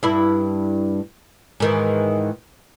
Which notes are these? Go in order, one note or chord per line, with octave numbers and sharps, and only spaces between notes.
G2 E4
G#2 D#3 E3